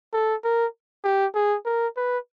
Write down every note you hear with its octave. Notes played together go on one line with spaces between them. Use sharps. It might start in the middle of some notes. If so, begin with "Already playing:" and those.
A4
A#4
G4
G#4
A#4
B4